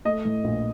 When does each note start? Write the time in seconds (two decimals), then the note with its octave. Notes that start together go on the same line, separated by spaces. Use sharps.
0.05 A3 D#5
0.25 A2
0.44 A#1